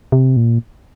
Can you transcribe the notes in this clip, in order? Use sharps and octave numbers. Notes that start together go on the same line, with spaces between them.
C3
A#2